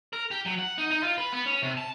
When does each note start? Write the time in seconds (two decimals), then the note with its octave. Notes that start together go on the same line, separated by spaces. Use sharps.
0.13 A#4
0.31 G4
0.46 F#3
0.59 F#5
0.78 D#4
0.91 D#4
1.03 F4
1.18 B4
1.33 B3
1.46 C#4
1.62 C3
1.77 A5